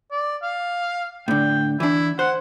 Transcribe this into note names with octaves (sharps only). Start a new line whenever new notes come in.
D5
F5
A2 D3 G5
E3 D4 E4
C5 F#5